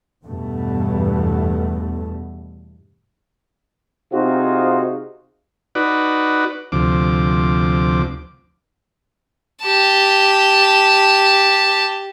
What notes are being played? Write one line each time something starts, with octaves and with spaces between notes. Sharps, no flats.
E2 G2 B2 A3
C3 C4 D#4 F4 F#4 G#4
D#4 F#4 B4 D5
D2 C3 F3 D6
G4 A5